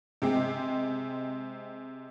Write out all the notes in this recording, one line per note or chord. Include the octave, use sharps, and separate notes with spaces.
C3 G#3 C4